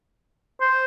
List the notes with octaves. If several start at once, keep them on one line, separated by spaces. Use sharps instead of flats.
C5